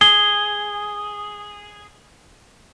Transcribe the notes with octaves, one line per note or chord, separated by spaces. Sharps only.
G#4 G7